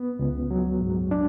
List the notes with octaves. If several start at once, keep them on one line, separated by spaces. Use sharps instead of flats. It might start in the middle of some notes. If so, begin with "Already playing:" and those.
Already playing: B3
C#2
F#3
G#2
D4